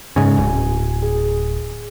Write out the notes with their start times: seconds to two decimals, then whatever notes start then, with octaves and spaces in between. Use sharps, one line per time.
0.16 G#2 C#3 G#5
0.37 D1
1.03 G#4